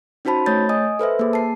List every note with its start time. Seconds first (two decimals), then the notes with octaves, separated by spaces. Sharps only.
0.25 C#4 D#4 F#4 C5 A5 B5
0.46 A3 C#5 G6 A6
0.69 D#5 G#5 D#6
0.99 A4 B4 C5 E5
1.19 A#3 G#4
1.33 A5 C7